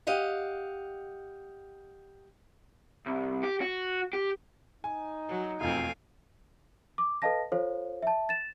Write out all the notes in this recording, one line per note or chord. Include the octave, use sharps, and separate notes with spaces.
G4 D#5 F5 F#5
C2
G4
F#4
G4
D#4 G#5
F#3
E1 F2 A3 C4 F5 G#5
D6
A4 B4 D#5 F5 A5 A#6
F4 A4 C5 C#5 F5
E5 A5
A6 E7